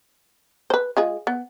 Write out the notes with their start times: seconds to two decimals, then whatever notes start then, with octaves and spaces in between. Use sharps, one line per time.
0.70 B4 C5
0.97 G#3 F4 G#4
1.27 B3